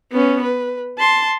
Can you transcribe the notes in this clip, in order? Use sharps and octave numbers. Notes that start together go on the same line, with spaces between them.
B3 C#4
B4
A5 C6